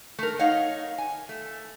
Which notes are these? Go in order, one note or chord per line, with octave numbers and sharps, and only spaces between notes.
A3 A#4
D#4 C#5 D#5 F5 F#5
G#5
A3